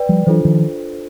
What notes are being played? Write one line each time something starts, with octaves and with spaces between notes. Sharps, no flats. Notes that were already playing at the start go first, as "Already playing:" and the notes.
Already playing: B4 D5 G5
F3 G3
E3 F#3 D4 F4 A4 C5
D#3 F3